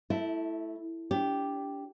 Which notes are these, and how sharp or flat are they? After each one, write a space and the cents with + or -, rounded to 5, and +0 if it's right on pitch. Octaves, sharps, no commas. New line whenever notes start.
A3 +0 E4 +0 E5 -35
D4 -40 G4 +0